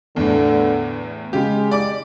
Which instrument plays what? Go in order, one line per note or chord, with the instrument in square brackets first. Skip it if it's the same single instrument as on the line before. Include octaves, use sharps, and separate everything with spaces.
[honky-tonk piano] E2 A2 [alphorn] D3
[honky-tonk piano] C#3 G4 [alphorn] G#3
[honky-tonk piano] D5 D6